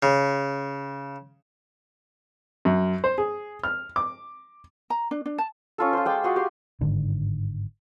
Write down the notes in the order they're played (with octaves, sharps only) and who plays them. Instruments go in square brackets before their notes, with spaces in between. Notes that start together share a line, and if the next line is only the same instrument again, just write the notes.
[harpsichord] C#3
[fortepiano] F#2
C5
G#4
F6
D6
[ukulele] A#5
D4
D4
A5
[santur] C#4 F4 A4
F4 C5
G#3 G5 D6
F4 F#4 G#4 C6
G4 C6
[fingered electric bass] G1 G#2 D3 D#3